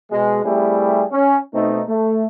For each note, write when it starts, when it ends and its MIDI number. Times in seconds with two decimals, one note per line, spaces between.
0.11 0.40 47
0.11 0.40 56
0.44 1.04 55
0.44 1.04 57
0.44 1.04 60
0.44 1.04 64
0.44 1.04 67
0.44 1.04 68
1.11 1.38 61
1.54 1.82 47
1.54 1.82 57
1.54 1.82 60
1.54 1.82 63
1.88 2.26 57